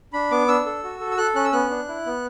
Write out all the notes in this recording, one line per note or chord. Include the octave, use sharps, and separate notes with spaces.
D4 B5
B3 D6
D4 E6
A4
F#4
A4
E6
A4 F#6
C#4 F#6
E6
B3 F#6
D4
E4
B3